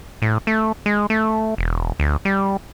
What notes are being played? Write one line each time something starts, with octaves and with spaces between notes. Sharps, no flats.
A2
A3
G#3
A3
E1
D2
G3